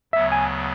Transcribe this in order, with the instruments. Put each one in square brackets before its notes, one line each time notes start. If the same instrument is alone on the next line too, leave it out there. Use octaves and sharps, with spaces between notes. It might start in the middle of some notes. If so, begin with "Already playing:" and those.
[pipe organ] D2 C#3 F#3 B3 [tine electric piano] E5
[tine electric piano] G#5